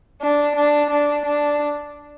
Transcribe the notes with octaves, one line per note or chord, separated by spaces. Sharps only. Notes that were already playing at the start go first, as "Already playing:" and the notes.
D4
D4
D4
D4